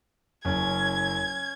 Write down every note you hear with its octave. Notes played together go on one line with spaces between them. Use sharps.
F#1 C#4 G#6